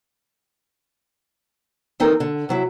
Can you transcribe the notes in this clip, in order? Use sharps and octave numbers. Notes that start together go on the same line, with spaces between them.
E3 C4 D#4 A4 A#4 G5
D3
C3 F#3 E4